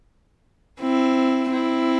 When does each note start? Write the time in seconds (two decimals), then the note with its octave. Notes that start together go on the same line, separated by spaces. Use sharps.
0.81 C4 E4
1.52 C4 E4